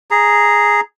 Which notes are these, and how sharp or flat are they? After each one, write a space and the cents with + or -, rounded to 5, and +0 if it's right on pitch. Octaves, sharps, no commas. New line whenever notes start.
G#4 +0 A#5 +0